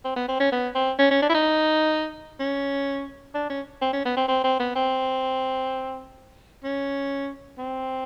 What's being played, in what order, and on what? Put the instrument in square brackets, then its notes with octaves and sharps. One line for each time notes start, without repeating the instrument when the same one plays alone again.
[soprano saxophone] C4
B3
C4
C#4
B3
C4
C#4
C#4
D4
E4
D#4
C#4
D4
C#4
C4
C#4
B3
C4
C4
C4
B3
C4
C#4
C4